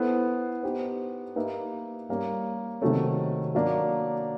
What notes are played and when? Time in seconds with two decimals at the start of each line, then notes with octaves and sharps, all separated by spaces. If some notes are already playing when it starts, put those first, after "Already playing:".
Already playing: B3 E4 A4 C5
0.63 B3 D#4 G4 C5
1.36 A#3 D#4 G4 B4 E5
2.09 G3 A#3 C#4
2.81 C3 D#3 F#3 A3 C#4
3.55 F#3 A#3 D4